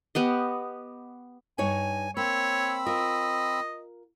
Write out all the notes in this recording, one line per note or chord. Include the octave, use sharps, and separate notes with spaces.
B3 G4 D#5
G2 D#4 C#5 G#5
A#3 C4 C#5 B5 E6
F4 A#4 D#5